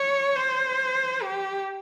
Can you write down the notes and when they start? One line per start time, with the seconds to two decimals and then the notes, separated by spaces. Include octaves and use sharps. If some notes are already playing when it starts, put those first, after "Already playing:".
Already playing: C#5
0.36 C5
1.22 G4